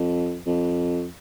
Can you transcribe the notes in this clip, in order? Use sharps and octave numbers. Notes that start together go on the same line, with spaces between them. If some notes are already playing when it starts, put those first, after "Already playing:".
Already playing: F2
F2